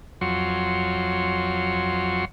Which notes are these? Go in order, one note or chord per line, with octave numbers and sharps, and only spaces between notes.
F2 F#3 C#5 C6